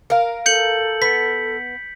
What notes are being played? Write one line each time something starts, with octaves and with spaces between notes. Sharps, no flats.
A#4 F5
A4 G6 C#7 F#7
B3 B6